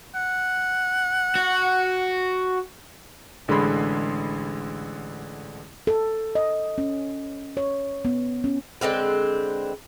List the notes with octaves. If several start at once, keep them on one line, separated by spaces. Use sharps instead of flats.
F#5
F#4
A1 D3 G#3 G#4 B5 C6
A4
D#5
C#4
C#5
B3
C#4
D3 G#3 C4 B4